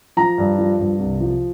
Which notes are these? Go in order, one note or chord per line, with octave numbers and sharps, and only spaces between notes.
F3 A#5
G2
F3
G2
C2
F3